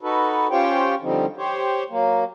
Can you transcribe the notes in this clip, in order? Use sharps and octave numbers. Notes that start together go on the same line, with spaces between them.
D#4 F#4 A4 B4
C#4 F4 G4 C5 C#5 G5
D3 F3 G3 C4 D#4
G4 C5 C#5
F#3 A#3